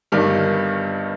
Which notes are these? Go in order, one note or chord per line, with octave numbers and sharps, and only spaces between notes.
G1 G2 D#3 G3